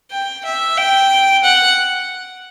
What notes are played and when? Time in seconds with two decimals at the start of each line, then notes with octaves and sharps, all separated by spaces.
0.12 G5
0.45 E5
0.77 G5
1.44 F#5